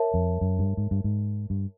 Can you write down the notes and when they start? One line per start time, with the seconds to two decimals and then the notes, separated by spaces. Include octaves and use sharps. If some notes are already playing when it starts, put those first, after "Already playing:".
Already playing: A#4 C#5 E5 A5
0.14 F2
0.41 F#2
0.59 G2
0.77 G#2
0.91 G2
1.04 G#2
1.50 G2